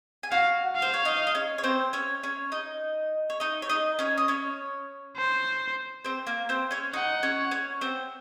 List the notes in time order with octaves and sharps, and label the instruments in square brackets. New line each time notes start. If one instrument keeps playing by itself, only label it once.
[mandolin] G#5
[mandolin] F#4 F#5 [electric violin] F5
[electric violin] F5
[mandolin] C5
C#5
D#4 D#5
D#5
C#4 C#5
C#5
C4 C5
C#4 C#5
C#4 C#5
D#4 D#5
C#5
D#4 D#5
C#5
D#4 D#5
C#4 C#5
D#5
C#4 C#5
[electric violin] C5
[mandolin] C4 C5
A#3 A#4
C4 C5
C#4 C#5
[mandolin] D#4 D#5 [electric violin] F#5
[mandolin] C#4 C#5
C#4 C#5
C4 C5